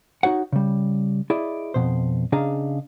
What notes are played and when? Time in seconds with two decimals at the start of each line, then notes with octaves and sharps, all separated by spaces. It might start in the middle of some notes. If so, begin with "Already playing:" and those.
0.23 D#4 F#4 C#5 F#5
0.53 C#3 G3
1.30 E4 G#4 D5 D#5
1.74 F2 B2 C5
2.32 C#3 D4 G#4 D#5 F5 A#5